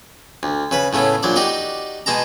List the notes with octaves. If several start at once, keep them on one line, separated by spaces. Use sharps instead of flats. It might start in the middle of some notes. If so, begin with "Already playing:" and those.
D2
C#3 B4 B5
A2 C#3 A3 B3
A#1 F#3 D5
D#4 F#4 G4 D5
B2 G#3 A5 A#5